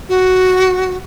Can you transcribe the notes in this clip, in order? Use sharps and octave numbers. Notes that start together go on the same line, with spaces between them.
F#4